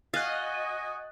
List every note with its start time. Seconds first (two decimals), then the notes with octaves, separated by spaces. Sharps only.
0.14 F#4 D#5 F5 G#5 F#6 A6